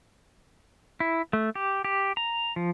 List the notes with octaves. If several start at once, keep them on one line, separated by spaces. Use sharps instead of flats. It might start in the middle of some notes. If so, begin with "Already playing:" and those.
E4
A3
G4
G4
A#5
F3